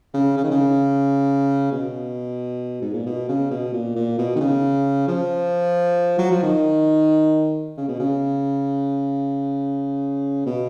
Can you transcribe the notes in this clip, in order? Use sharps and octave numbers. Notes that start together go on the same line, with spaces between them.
C#3
C#3
D#3
C#3
B2
G#2
A#2
B2
C#3
B2
A#2
A#2
B2
D#3
C#3
F3
F#3
F3
D#3
C#3
B2
C#3
B2